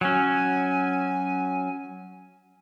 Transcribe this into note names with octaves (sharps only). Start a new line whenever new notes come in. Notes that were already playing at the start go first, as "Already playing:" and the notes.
F#3 C#4 G#5